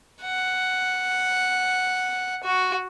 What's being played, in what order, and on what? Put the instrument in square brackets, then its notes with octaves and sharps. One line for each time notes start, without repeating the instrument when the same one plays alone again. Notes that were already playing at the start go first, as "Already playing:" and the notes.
[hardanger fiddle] F#5
F#4